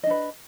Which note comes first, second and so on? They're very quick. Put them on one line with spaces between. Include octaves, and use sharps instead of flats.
D#5 D4 B4